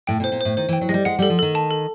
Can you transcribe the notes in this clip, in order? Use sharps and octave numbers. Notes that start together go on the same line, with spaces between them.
A2 G5
B2
C5
A#2
A2 C5
D#3 C5
E3
G5
F#3
G3 G#3 D#5
G#3 F#5
G3
A4
F3
D#3 A4
A5
A4